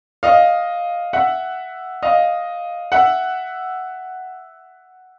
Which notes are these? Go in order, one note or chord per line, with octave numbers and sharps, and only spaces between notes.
D#5 F5
E5 F#5
D#5 F5
E5 F#5